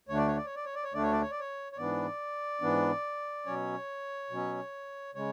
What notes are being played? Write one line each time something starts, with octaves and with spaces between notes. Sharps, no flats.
D2 D3 A3 D4 C#5
D5
C#5
D5
C#5
D5
C#5
D5
C#5
D2 D3 A3 D4 D5
C#5
D5
C#5
D5
C#5
C#5
G#2 E3 B3 D4 D5
G#2 E3 B3 D4
B2 F#3 C#4 C#5
B2 F#3 C#4
C#3 G#3 C#5